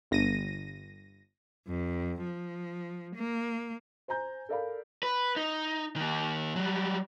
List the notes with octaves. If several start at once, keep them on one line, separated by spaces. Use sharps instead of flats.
G1 A#6 D#7
F2
F3
A#3
C5 G#5 A#5 G6
A4 A#4 D5 F5 B5
B4
D#4
D#3 A#3
F#3 G3